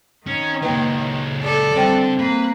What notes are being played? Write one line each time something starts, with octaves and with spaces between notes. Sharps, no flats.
D#3 C#4
C#2 F#3 A#3 B4
A4 D5
D3 G3 C4 G5
A#3 B4